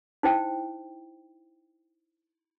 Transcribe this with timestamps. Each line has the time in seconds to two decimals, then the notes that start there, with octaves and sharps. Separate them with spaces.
0.23 D#4 E4 C5 G5